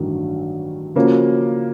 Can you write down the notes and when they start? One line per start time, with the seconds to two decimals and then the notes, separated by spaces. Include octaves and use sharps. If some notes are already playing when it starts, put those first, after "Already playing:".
Already playing: A1 G2 D#3 F#3
0.95 C#3 F3 A#3 C#4 F#4